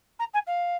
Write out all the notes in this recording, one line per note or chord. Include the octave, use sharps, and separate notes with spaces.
A#5
G#5
F5